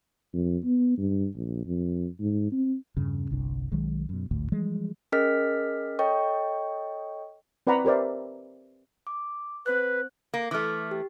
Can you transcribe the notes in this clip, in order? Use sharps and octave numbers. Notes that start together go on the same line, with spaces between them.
F2
B3
G2
A#1
F2
G#2
C4
E2 G2 C#3
G1 C2 C3 D4
B1 D#3 F#3 G#3
F#2 B2
G#1 D2 A2
E3 F3 G3 G#3
C#4 G#4 A#4 D#5 F6 B6
A4 C#5 D#5 G5 C#6
C4 B4 D5 F#5 A#5 B5
G4 A#4 C5 D5 E5
D6
C4 B4 C5 F#6
A#3
E3 A3 D6 F6
G4